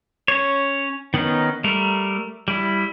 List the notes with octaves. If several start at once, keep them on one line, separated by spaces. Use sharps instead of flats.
C#4 C#5
D#3 B3 C#4 D#4
G3 A3 A#4
G3 E4